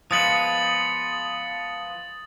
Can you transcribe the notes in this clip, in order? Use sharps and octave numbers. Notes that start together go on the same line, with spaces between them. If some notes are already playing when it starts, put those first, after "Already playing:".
F3 G#3 B3 D#6 A6 F#7